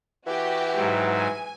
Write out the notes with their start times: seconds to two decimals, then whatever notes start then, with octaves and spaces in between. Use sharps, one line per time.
0.26 E3 F#4 G4 G5
0.75 G#2 F#3
1.14 G#5